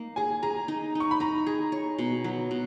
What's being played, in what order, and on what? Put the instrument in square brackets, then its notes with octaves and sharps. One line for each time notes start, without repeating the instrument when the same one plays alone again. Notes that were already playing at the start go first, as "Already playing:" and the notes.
Already playing: [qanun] A#3 D#4
[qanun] G#4 [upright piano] G#5
[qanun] G#4 [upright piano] A#5
[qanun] D#4
D#4
[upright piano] C#6
B5
[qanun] D#4 [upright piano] A#5
[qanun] G#4
C#5
B2
F#3
B2